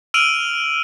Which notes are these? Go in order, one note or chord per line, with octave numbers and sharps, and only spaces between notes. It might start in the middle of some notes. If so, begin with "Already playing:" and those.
E6 F6 D7 D#7 F7 F#7